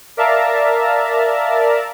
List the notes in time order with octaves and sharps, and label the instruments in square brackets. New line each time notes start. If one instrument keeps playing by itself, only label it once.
[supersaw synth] A#4 D5 E5 F5 A5 A#5